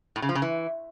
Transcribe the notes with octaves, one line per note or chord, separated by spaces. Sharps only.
A2
C#3
F3
C#3
E3